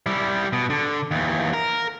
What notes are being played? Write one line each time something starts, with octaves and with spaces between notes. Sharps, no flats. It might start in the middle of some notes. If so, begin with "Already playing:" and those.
G3 E4
B2
D3
D#2 E3
A#4